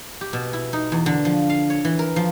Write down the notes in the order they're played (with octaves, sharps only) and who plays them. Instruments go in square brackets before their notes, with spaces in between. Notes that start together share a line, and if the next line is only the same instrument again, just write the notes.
[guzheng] G4
B2
E4
D#4
E2
D3
F3
F5
C#5
E3
A#4
F3